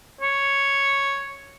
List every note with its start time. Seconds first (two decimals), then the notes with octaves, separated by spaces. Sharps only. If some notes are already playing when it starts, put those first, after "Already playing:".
0.21 C#5